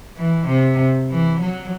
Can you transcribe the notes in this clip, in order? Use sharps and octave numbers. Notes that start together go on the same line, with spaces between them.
E3
C3
E3
F#3